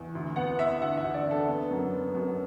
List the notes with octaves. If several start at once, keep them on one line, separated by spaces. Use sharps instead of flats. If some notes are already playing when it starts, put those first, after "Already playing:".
Already playing: E2
D2
B3 F#5
B3 E5
D2 F#5
E5
D2
D5
D3
A4
B3
F#2
B3
F#2